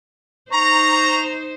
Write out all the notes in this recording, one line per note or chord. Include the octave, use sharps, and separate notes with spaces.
D#4 C5 A#5 C#6